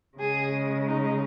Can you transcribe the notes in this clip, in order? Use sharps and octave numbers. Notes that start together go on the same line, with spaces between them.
C#3 G#3 G#4
D#4